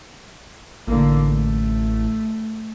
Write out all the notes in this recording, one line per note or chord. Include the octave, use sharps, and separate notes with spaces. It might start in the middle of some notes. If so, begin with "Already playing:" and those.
A1 D3 A#3
A3